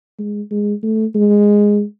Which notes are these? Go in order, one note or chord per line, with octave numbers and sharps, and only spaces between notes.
G#3
G#3
A3
G#3